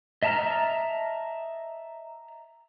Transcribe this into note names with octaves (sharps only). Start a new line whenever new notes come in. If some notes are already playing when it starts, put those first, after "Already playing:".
D#5 E5 A5 A#5 F6